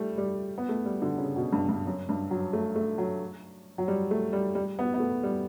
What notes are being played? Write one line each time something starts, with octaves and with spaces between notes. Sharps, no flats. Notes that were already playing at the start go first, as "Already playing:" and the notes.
Already playing: G3 A3
G3
B3
A3
G3
D3
C#3
B2
G2
G2
F#2
G2
F#3
A3
A3
F#3
F#3
G3
A3
G3
G3
B3
B3
A3
G3